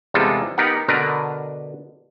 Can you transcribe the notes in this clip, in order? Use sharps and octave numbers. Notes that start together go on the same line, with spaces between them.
E2 C3 G3 G#3 F4 A4
B3 D#4 G4 A#4 F#5
B2 D3 D4 A#4 B4